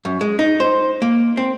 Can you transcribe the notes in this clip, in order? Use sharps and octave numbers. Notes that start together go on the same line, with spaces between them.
F#2
G#3
D#4
C5
A#3
C4